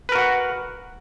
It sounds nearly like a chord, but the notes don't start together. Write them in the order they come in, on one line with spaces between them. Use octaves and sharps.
B4 A#4 F#4 F#5